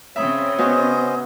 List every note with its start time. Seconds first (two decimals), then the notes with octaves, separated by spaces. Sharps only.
0.16 C#3 C4 C#5 E5 B5 D#6
0.58 B3 C#4 F#4 C5 D#5